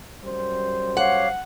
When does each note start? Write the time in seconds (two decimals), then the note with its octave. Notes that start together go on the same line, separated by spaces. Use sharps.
0.23 F#2 G3 C5
0.97 C#5 F5 F#5 D6